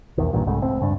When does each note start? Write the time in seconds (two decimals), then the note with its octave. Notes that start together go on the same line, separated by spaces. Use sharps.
0.18 B1 E2 D#3
0.33 A1 G2 A#2
0.47 C2 G#2 C#3 A3
0.62 C#2 A2 C4
0.81 C#2 G2 D4